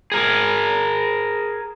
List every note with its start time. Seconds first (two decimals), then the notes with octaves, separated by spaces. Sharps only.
0.12 G#4 A#4